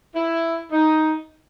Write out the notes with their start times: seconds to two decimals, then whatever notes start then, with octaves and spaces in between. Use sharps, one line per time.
0.16 E4
0.72 D#4